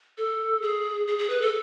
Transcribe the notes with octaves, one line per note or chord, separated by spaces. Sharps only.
A4
G#4
G#4
G#4
B4
A4